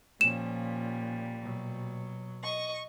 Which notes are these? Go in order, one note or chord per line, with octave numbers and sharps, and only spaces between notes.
A#2 F3 G3 C#4 E7
B2 F#3
D#5 C#6